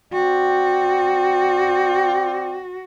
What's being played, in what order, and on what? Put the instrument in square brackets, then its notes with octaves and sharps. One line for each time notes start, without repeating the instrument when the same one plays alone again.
[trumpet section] C4 D5 G5 [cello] F#4